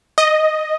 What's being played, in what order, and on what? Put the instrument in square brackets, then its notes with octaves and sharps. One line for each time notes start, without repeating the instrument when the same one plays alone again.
[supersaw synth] D#5